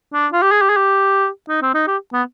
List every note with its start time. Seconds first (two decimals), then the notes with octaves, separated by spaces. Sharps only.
0.14 D4
0.33 F4
0.42 G4
0.52 G#4
0.62 G4
0.69 G#4
0.77 G4
1.49 D#4
1.62 C4
1.74 D#4
1.88 G4
2.13 B3